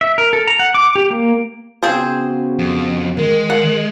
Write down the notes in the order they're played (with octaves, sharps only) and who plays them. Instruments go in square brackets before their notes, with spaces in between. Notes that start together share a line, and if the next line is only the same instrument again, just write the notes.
[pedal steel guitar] E5
A#4
A4
A#5
F#5
D6
G4
A#3
[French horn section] C#3 B3 F#4 [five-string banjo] C4 G#4 C5
[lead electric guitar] F2
[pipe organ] D#3 [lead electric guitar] G#3
[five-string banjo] F#5